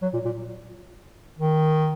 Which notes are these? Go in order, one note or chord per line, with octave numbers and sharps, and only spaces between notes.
F#3
A#2
A#2
D#3